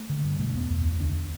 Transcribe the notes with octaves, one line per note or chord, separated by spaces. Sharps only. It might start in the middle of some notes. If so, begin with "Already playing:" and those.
Already playing: A3
D3
G2
B2 A3
D4
E2 B3
E2
E2
D2 D4